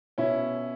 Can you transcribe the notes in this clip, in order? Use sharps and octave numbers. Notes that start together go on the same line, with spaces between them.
B2 C#4 E4